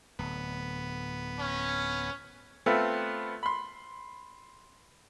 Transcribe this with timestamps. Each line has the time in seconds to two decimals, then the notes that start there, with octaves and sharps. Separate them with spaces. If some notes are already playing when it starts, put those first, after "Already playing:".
0.19 D1 B3
1.39 C#4
2.66 A3 B3 C4 F4 A4
3.43 B5 C6